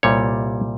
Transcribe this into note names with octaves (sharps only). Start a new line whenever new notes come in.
C2 A#2 G3 C#5